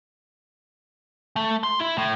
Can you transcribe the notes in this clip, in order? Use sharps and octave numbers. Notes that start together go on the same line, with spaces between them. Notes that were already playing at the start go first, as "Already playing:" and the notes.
A3
C6
E4
A2